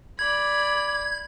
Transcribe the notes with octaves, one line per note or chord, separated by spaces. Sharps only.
D5 B5 G#6